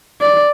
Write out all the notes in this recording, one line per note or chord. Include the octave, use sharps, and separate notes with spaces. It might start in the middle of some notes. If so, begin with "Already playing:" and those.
D5